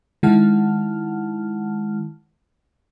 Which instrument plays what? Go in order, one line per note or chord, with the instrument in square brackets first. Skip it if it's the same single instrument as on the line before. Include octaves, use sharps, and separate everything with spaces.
[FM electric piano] D#3 G#3 E4 F#5 A5 F6